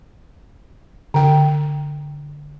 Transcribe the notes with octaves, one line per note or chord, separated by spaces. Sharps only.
D3 G5